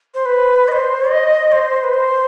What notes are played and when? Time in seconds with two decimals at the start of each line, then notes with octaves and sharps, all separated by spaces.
0.14 C5
0.26 B4
0.68 D#5
0.72 C5
1.10 D#5
1.52 C5
1.84 B4
1.94 C5